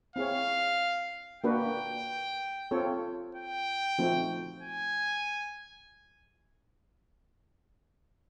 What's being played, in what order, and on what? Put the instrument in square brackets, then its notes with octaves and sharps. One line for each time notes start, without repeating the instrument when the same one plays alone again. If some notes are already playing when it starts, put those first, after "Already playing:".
[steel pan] C4 E4 G#4 C#5 [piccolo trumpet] F5
[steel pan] A#3 D4 F#4 B4 [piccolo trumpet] G5
[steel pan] C4 F4 A4 C#5
[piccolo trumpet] G5
[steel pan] F3 A3 C4 D#4 F#4
[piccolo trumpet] G#5